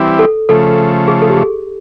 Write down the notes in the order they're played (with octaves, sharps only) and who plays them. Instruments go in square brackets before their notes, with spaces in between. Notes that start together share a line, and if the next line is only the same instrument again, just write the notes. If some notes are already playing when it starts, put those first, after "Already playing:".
Already playing: [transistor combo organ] E3 G3 C4 E4 G4
[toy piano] A4
[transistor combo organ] C#3 F3 A3 [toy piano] A4
[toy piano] G#4
A4
G4
G#4